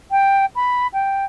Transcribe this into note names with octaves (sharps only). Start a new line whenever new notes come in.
G5
B5
G5